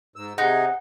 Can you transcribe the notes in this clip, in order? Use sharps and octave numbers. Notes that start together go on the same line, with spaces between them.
G#2 E6
C3 D#4 G#4 F#5